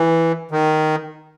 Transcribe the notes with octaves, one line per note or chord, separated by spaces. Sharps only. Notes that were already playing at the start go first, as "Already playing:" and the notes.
Already playing: E3
D#3